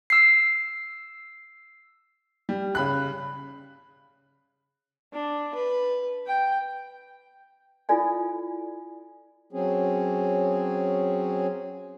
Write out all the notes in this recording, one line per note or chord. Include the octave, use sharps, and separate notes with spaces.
E6 C7
G3
C#3 B5 F#6
D4
B4
G5
E4 F4 A4 D5 G#5
F#3 C4 C#4 G#4